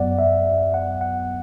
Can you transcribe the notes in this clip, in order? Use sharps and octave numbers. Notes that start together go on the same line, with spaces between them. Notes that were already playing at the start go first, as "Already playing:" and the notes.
Already playing: F#2 F#3 B3 D5 F#5
E5
F#5
F#5